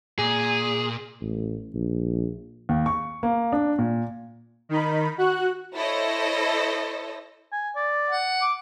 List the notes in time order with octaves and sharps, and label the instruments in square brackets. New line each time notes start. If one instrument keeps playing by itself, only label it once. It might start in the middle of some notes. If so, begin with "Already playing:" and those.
[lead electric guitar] A#2 [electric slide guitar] G#4
[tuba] A1
A#1
[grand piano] D#2
C#6
A#3
D4
A#2
[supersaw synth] D#3 D#4 B5
F#4 F#6
[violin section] E4 A4 C5 C#5 D#5
[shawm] G#5
D5
[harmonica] F#5
[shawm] D6